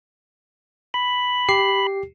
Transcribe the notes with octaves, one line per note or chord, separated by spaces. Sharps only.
B5
G4 C7